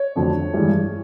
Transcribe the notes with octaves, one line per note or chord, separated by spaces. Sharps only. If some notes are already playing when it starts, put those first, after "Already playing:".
Already playing: C#5
F2 D3 F#3 A3
G2 E3 G#3